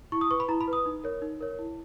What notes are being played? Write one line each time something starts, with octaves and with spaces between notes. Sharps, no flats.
E4 C#6
D#6
B4 C#6
B5
E4 A#5
B5
B4
D#6
D#4
A#4 C#5
D#4
A#4 C#5
E4